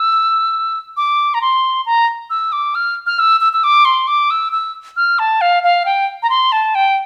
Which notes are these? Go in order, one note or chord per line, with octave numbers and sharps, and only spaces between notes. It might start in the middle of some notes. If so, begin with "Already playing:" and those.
Already playing: E6
D6
A#5
C6
A#5
E6
D6
F6
F6
E6
E6
E6
D6
C6
D6
E6
E6
F6
A5
F5
F5
G5
A#5
C6
A5
G5